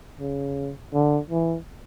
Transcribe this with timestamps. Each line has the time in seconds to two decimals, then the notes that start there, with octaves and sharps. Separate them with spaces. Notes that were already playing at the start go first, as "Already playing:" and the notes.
0.20 C#3
0.94 D3
1.31 E3